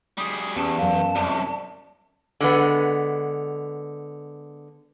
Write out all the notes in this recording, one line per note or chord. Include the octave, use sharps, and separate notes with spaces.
G3 G#4 D#6
E2 C#4 G4 A5
F#2 F5
C2 F#2 D5
D3 G#3 B3